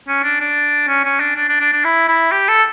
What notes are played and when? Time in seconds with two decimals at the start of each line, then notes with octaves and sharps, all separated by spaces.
0.08 C#4
0.23 D4
0.40 D4
0.88 C#4
1.04 C#4
1.20 D4
1.36 D4
1.49 D4
1.60 D4
1.73 D4
1.84 E4
2.08 E4
2.32 G4
2.48 A4